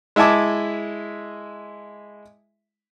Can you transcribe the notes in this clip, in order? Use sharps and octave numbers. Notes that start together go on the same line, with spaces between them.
G#3 E4 E5 G#5 A5 D6